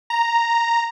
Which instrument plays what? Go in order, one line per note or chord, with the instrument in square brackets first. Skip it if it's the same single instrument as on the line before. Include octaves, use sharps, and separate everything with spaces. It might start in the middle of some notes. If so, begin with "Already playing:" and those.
[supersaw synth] A#5